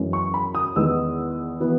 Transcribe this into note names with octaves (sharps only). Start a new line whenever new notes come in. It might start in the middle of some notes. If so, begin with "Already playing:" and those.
Already playing: F#2 E3 G#3 C#4
C#6
B5
D#6
E2 D#3 G#3 B3 E6
E3 B3